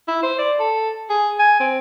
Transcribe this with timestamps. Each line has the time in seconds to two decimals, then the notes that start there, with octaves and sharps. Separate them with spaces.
0.08 E4
0.23 C5
0.39 D5
0.59 A4
1.10 G#4
1.39 G#5
1.60 C4